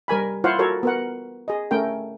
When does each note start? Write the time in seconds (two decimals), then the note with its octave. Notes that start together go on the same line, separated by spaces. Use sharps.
0.08 G3 A#4 G#5 B5
0.44 E4 F4 C5 C#5 F5 F#5
0.59 F#4 A4 A#4 C#5
0.83 B3 A#4 F#5
1.48 G#4 D#5
1.71 A3 C#4 A#4 G5